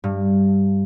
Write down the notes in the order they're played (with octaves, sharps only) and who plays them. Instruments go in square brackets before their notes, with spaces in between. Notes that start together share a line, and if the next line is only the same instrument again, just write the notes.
[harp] G2